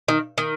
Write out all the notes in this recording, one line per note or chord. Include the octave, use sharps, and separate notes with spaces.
D#3
D#3